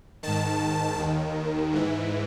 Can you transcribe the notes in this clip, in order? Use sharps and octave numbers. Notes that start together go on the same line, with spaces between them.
G#2 D#3 A5
D#2 D#3
G#2 E3